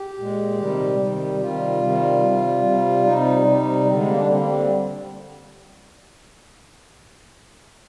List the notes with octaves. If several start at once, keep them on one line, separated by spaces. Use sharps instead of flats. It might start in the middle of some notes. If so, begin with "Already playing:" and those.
Already playing: G4
A#2 G#3
C3 D#3 G3
C3 D#3 G3
C3 D#3 G3 F4
C3 D#3 G3
C3 G3
C3 G3
C3 G3 D#4
C3 G3
D3 G3 C4
G#3
A#3
D4
D3 G3 C4
A#3
C4